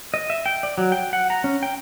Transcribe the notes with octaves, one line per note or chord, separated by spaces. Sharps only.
D#5
E5
G5
D5
F#3
G5
F#5
A#5
C#4
G5